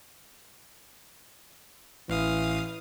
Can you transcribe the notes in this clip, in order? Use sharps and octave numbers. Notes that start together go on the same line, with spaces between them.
A1 E3 F5 D#6